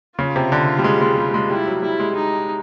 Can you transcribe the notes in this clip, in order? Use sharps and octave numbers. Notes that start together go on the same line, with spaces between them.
C#3 F4
C3
D3
G3
G#3
G#3
G3
G#3
G3 E4
F#3
G3 E4
G#3
D#4